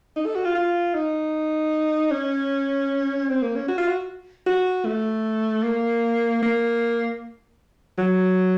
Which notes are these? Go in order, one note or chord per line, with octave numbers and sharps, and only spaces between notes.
D#4
A4
F#4
F4
F4
D#4
C#4
C4
A#3
C#4
F#4
F4
F#4
F#4
A3
A#3
A#3
F#3